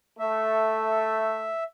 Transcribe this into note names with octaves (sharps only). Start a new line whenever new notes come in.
A3 E5